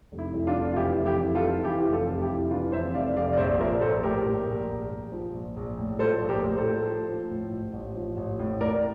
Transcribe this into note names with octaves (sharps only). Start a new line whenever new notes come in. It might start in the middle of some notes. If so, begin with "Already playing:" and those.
F1
E4
F1
D4 F4
F1
F4
E3 E4 G4
F1
E4 G4
F1
F4 A4
E3
E3 E4 G4
F1 G4
F4 A4
F1
E4 G4
F1
E3 D4 F4
F2 C5 E5
F1 D5 F5
F1 D5 F5
D5
A#1 C5 E5
F3 A#4 D5
A#1 A4 C5
A2 G4 A#4
A#1
A#1
A#1
A#1
F3
A#1
A#1
A2
F3 A4 C5
A#1
G4 A#4
A2
A4 C5
F3
F3
F3
A2
A1
A1
F3
A1
A2
A2 A#4 D5